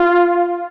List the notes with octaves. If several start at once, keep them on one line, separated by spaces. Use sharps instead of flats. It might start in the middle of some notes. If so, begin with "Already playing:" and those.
Already playing: F4